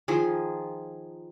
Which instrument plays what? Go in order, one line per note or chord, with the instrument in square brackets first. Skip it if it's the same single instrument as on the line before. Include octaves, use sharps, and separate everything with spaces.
[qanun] D#3 F3 G#4